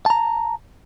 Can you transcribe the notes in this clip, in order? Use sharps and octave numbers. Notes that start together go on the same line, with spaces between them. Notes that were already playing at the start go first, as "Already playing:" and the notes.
A5 A#5